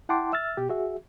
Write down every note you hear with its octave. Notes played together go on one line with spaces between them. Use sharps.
E4 F#5 G5 A5 C6 D6
E5 E6 F6 A6
B2 G4
F#4 G#4 E5